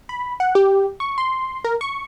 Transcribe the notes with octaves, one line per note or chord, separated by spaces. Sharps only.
B5
F#5
G4
C#6
C6
A#4
C#6